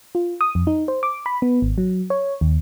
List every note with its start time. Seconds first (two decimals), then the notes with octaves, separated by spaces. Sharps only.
0.15 F4
0.41 D#6
0.55 F2
0.67 D#4
0.88 C5
1.03 D6
1.26 B5
1.42 B3
1.62 G#1
1.78 F#3
2.10 C#5
2.41 D#2